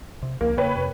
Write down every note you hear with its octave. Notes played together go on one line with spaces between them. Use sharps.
C3
C#2 F3 A#3
E2 C#3 A#3 B4 C#5 G5
F2 C3